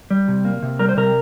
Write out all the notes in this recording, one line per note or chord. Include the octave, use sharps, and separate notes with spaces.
G3
C3
A#3
C3
G3 A#4
C5
C3 A#4